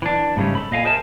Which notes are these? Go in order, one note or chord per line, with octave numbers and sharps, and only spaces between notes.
E3 D4
G#2 C#3 G3 A3 C#4
A4 B5
A#2 D#5 F5 G#5
G#4 A#4 C5 E5 G#5 A5